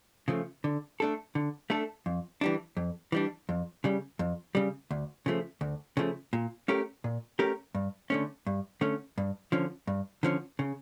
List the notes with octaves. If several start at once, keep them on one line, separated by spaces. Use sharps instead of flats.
C#3 F3 A3
D3
A3 D4 A4
D3
A3 D4 A4
F2
E3 G3 D4
F2
E3 G3 D4
F2
C#3 G3
F2
C#3 G3
D2
C#3 F3 A3
D2
C#3 F3 A3
A#2
A3 C#4 G4 A#4
A#2
A3 C#4 G4 A#4
G2
D3 A3 C#4
G2
D3 A3 C#4
G2
D3 F3 C#4
G2
D3 F3 C#4
C#3